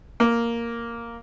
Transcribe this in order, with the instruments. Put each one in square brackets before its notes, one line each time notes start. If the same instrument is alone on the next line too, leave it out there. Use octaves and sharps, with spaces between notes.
[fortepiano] A#3